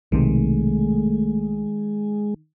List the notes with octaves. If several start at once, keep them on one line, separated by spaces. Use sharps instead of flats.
B1 C3 D#3 G#3 A3